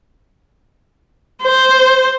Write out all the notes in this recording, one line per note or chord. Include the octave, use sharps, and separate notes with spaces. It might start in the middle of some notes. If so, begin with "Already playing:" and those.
C5